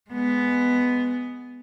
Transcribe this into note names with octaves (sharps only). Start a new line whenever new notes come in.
G#3 B3